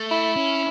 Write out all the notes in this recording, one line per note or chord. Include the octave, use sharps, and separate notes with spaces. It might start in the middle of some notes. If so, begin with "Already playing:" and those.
Already playing: A3
E4
C#4